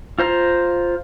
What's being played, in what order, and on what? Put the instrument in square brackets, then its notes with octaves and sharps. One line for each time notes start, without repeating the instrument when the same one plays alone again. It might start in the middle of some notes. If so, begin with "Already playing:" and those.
[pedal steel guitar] F4 C5 A#5